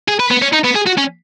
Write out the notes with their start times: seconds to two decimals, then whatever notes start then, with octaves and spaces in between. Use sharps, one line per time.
0.08 G#4
0.20 B4
0.31 B3
0.42 C#4
0.53 D#4
0.65 B3
0.76 G#4
0.87 F#4
0.98 C#4